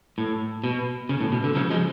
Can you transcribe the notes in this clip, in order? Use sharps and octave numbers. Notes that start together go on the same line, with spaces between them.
A2
B2
C#3
A2
B2
D3
C#3 F3
F3 G#3